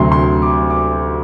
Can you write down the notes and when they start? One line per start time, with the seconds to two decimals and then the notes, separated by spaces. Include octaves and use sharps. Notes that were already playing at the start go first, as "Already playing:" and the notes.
Already playing: D2 C3 F#3 C6
0.12 C6
0.42 D6
0.70 D6